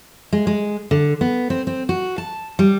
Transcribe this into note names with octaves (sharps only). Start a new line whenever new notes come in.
G#3
G#3
D3
B3
C4
C4
F#4
A5
G3